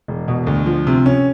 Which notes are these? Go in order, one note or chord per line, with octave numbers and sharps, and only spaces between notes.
E1
B2
D2
F3
C3
C#4